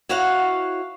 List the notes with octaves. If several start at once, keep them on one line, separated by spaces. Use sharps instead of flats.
E4 F#4 C#5 F5 F#5